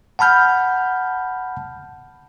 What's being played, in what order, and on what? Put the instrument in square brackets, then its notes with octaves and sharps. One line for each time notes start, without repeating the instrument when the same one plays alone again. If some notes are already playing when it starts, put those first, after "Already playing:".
[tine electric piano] F#5 A5 B5 F6 G6